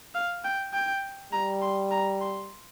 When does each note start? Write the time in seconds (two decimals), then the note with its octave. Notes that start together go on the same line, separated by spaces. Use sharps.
0.15 F5
0.44 G5
0.73 G5
1.33 G3 A#5
1.62 C6
1.91 A#5
2.21 C6